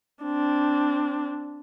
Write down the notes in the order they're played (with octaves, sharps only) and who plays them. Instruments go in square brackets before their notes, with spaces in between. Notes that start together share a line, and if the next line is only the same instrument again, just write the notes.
[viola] C4 D4